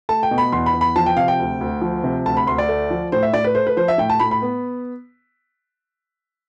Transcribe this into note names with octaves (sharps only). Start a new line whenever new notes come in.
A3 A5
G5
B2
B5
E2 C6
B5
E2
B5
F3 A5
G5
C3 F5
G5
D2
D2
F3
C3
D2 A5
B5
D2 C6
D5
A3
F3
A2 C5
E5
A2 D5
B4
A3 C5
B4
F3 C5
E5
A2 G5
A5
A2 B5
B5
B3